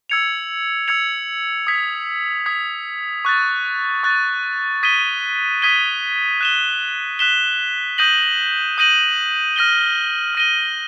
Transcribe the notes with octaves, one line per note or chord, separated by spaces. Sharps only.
E6 G#6 C#7 F7
E6 G#6 C#7 F7
D#6 G#6 B6
D#6 G#6 B6
C#6 F#6 A6
C#6 F#6 A6
D#6 G#6 B6 D#7 G7
D#6 G#6 B6 D#7 G7
F#6 B6 E7 G7
F#6 B6 E7 G7
D#6 G6 A#6 D#7 F#7
D#6 G6 A#6 D#7 F#7
F6 A#6 D#7 G7
F6 A#6 D#7 G7